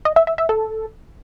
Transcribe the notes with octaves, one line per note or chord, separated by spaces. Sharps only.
D#5
E5
E5
E5
A4